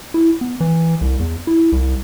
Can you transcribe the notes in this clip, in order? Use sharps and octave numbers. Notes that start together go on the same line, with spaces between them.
E4
B3
E3
C2
E2
E4
C2